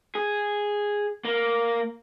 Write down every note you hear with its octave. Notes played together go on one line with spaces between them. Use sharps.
G#4
A#3